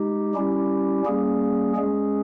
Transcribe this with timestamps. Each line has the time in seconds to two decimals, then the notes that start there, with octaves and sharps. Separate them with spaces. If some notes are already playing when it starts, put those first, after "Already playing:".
Already playing: G#3 D#4 G4
0.35 G3 C#4 E4 G4
1.06 G3 A#3 C#4 G#4
1.76 G#3 C#4 G#4